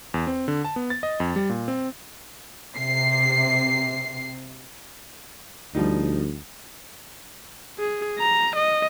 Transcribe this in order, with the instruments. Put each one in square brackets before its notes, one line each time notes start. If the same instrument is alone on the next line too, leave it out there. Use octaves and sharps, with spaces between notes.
[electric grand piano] E2
C4
D3
A5
B3
A6
D#5
F2
G3
A#2
C4
[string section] C3 C7
[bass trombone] D2 [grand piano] F3 G3 D#4
[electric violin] G#4
A#5
D#5